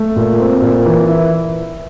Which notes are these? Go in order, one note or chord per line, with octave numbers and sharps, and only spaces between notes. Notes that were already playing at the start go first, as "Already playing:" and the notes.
Already playing: A3
A#2
C4
A#2
E3
E4